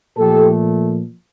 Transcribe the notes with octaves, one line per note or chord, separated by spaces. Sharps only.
A#2 F3 A3 G4 A4